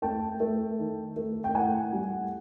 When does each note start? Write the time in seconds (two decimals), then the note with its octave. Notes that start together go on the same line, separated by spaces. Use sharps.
0.02 A3 G5 A5
0.40 A3
0.79 D#3
1.16 A3
1.44 G5
1.54 A2 F#5 G#5
1.93 G3